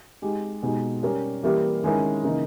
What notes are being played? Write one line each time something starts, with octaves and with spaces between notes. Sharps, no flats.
G#3 D#4 G4
B2 G#3 D#4 G4
G3 C#4 G4 A#4
E3 G3 A#3 E4 G4
D#3 G#3 C#4 E4 A#4
C#3 E3 A#3 D#4